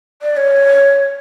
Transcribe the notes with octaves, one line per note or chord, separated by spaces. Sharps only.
D5
C#5